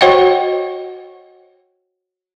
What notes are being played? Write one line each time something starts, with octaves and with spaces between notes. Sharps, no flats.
F#4 C5 C#5 D#5 F#5 G5